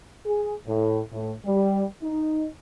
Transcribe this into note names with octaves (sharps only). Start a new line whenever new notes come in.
G#4
A2
A2
G3
D#4